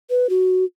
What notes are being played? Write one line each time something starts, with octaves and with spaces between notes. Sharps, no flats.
B4
F#4